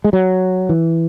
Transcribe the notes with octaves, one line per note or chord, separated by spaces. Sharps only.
G#3
F#3
E3